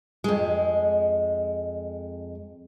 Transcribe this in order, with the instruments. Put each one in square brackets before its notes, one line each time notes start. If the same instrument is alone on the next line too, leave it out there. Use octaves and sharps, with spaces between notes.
[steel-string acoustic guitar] F2 G#3